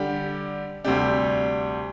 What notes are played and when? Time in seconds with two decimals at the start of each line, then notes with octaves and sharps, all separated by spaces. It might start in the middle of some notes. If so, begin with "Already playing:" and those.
Already playing: D3 G3 D4 G4
0.84 D2 C3 G3 D4 G4